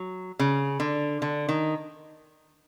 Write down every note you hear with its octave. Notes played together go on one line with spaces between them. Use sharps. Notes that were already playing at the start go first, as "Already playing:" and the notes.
Already playing: F#3
C#3
D3
D3
D#3